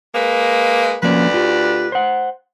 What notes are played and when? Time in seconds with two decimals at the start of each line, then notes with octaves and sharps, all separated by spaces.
0.14 G#3 A#3 B4
1.03 D2 F3 A#3 C#4 B4 D5
1.34 F4 G4
1.92 C5 F#5